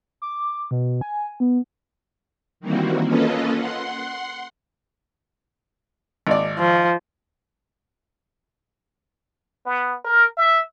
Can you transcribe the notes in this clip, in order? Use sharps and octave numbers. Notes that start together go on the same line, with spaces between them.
D6
B2
G#5
B3
D#3 E3 G3 A#3 C4 F#4
A#3 C#4 F4 A4 B4 D#5
F#5 C6
G#1 D5
F3
B3
A#4
E5